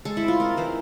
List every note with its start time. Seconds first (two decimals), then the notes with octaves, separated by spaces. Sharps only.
0.05 G#3 A4
0.17 E4
0.23 C4
0.28 F4
0.40 D#4 A#4
0.57 E3 C5